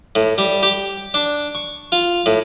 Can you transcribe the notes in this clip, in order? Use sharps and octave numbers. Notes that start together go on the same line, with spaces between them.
A2
G3
G4
D4
C#6
F4
A2